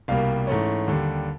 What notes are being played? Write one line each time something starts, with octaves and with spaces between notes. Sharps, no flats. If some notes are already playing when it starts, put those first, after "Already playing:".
C2 B2 G3 A#3 F5
G#2 E3 A3 C#4
D#2 D3 G3